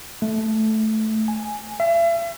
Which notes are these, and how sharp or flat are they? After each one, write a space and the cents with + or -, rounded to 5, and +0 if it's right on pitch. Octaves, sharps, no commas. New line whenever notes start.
A3 -10
G#5 +0
E5 +40